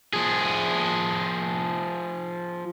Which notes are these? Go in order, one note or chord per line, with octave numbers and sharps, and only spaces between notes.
F3 G#4